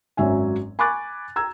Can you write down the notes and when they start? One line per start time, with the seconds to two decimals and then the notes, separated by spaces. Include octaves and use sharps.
0.17 G#1 F#2 F#3 E5 G#5
0.79 G#5 B5 C#6 D6 F#6 A6
1.36 A#5 E6 G#6